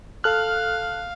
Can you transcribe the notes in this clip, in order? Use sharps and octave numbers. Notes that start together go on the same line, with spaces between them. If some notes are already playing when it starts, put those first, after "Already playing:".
A4 F5 F6 F#6